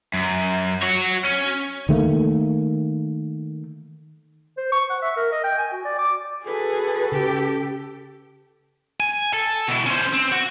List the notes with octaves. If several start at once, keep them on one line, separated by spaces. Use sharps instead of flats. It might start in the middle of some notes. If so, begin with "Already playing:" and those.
F#2
F#4 C#5
C#4
D#3 A3 A#3
C5
C#6
F#5
E5
A#4
D#5
G5
G#5
F#4
D5
D6
F#4 G#4 A4 B4
C#3 G4
G#5
A4
B2 E4
C#4 C5
C4
F#4